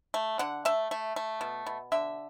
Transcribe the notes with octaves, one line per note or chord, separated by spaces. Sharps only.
A3
D3 F#5
A3 E5
A3
A3
B2
B2
D3 E5